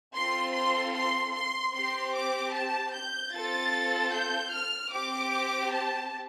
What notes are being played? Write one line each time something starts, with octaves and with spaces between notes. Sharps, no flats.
C4 F4 A4 C6
C6
C6
C6
C4 G4 C6
D6
A5
G6
C4 F4 A4 A6
G6
F6
C4 G4 D6
A5